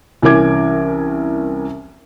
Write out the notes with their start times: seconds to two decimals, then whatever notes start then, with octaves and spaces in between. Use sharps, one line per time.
0.22 C2 E3 C#4 A#4 D6 G#6